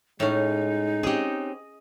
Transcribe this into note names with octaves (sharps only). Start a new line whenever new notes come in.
A2 G#3 C#4 D#4
C4 C#4 G4 G#4 D#5